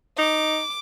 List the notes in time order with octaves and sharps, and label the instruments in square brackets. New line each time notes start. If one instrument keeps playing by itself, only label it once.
[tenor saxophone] D#4 [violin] D6